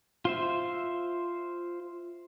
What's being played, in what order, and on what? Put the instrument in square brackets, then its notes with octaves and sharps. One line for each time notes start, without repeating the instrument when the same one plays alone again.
[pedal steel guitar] F4 C5 E5